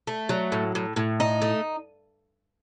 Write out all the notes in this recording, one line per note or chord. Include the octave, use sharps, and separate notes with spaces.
A3
F#3
A2
A2
A2
D#4
A3